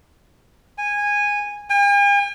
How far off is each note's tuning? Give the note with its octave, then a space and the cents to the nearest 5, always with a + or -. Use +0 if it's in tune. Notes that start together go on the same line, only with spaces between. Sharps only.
G#5 -15
G#5 -45